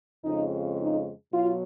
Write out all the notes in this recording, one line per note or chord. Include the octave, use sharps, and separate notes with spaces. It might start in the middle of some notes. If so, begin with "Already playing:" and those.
F2 C#3 G#3 D#4
D#4
B2 F#3 F4